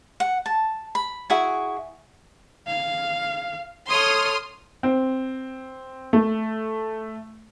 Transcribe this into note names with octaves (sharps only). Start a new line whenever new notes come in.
F#5
A5
B5
E4 F#4 G#4 G#5
F5
A4 C#5 C6 D#6 F6
C4
A3